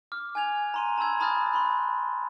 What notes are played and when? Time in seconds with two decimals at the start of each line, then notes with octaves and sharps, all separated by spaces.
0.12 D6 F6
0.35 G#5 F#6 G#6 F7
0.74 A#5 C6 D#7
0.98 A5 B5 C6 E6 G#6
1.20 A5 B5 D#6 F6 F#6 A6
1.54 B5 C6